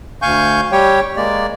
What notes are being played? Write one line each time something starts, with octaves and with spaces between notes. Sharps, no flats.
D2 F5 G#5 C#6 G6
G3 G4 C#5 G5
G#3 A#3 D5